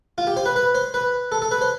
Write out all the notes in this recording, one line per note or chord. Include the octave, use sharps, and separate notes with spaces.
F4
G4
C5
B4
B4
C5
B4
A4
A4
B4
C5